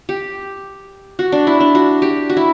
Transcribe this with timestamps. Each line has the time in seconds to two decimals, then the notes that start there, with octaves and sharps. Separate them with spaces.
0.09 G4
1.19 F#4
1.32 D4
1.47 E4
1.60 D4
1.75 F#4
2.02 G4
2.30 F#4
2.37 E4